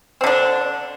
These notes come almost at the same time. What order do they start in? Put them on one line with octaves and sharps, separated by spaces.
C4 D3 D4